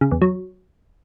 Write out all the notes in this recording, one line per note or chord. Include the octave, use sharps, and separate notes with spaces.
C#3
E2
F#3